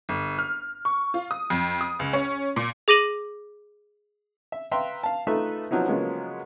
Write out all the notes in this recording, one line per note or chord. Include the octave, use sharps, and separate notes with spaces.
G1
F6
C#6
F4
D#6
F2
D#6
C#2
C#4
A#2
G#4 D6 A#6 D#7 F#7
E5
B4 E5 F5 G5 A#5 C6
F5 A5
A3 D#4 F4 A4 B4 E5
F3 F#3 B3 D#4 E4
C#3 F3 F#3 G#3 A#3 B3